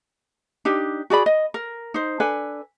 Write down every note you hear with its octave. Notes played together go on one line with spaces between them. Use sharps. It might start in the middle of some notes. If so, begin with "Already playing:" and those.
D4 D#4 G4
F#4 G#4 D5 B5
D#5
A#4
D#4 C5
D4 A4 B4 G#5